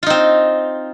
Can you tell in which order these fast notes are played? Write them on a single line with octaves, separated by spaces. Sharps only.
F4 D#4 C4